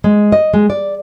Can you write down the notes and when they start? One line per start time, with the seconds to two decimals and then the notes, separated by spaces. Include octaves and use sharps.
0.04 G#3
0.32 D#5
0.54 G#3
0.70 D5